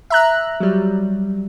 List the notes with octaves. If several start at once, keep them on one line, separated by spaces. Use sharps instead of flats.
E5 A#5 F#6
F#3 G3